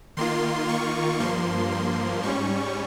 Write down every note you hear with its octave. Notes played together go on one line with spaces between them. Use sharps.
D#3 A#3 F4 C6
C#6
G2 F3 A#3 C6
C6
G#2 G3 C#4 C#6